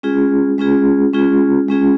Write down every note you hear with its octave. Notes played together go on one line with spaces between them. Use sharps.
G#3 C#4 F4 G#4
G#3 C#4 F4 G#4
G#3 C#4 F4 G#4
G#3 C#4 F4 G#4